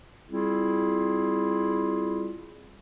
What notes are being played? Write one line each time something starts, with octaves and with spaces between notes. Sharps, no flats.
G3 C4 E4 F4 G#4